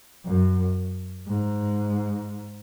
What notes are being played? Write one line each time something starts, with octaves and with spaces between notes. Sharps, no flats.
F#2
G#2